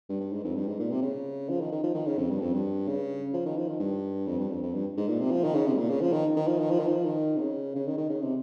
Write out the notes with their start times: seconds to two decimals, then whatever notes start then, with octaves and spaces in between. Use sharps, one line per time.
0.09 G2
0.20 G2
0.33 G#2
0.44 F2
0.56 G2
0.68 G#2
0.79 A#2
0.91 C3
1.02 C#3
1.49 F3
1.61 D#3
1.72 D#3
1.84 F3
1.95 D#3
2.07 C#3
2.18 F2
2.30 G2
2.41 F2
2.53 G2
2.88 C#3
3.34 F3
3.46 D#3
3.58 F3
3.69 D#3
3.80 G2
4.27 F2
4.39 G2
4.50 F2
4.62 F2
4.73 G2
4.97 G#2
5.08 A#2
5.20 C3
5.31 F3
5.44 D#3
5.54 C#3
5.67 C3
5.74 G#2
5.78 A#2
5.90 C#3
6.01 F3
6.13 D#3
6.36 D#3
6.47 F3
6.60 D#3
6.71 F3
6.79 D#3
6.88 F3
7.05 D#3
7.37 C3
7.41 C#3
7.75 C#3
7.87 D#3
7.98 D#3
8.09 C#3
8.22 C3